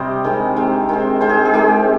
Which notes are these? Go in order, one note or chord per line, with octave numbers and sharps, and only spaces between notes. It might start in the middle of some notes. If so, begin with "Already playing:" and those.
Already playing: C3 G3 C5 D#5
D#3 G#3 C4
D#3 G#3 C4
D#3 G#3 C4
D#3 G#3 C4 C5
G#4
G#4
D#3 G#3 C4 G4